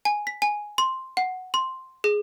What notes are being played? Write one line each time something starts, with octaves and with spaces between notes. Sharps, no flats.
G#5
B6
G#5
C6
F#5
C6
G#4